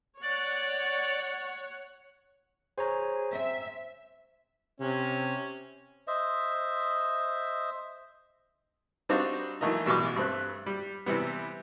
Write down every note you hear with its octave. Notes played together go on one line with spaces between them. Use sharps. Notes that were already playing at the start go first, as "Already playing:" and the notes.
C#5 D5 F#5
G#4 C5 C#5 A#5
C4 E5
C3 C#4
C5 D#5 E5
G3 C4 D4 D#4 F#4 F5
E3 F#3 A3 A#3 D#4
A1 B2 G3 G#3 D6
G2 A3 C4 F#6
G3
C3 E3 G3 B3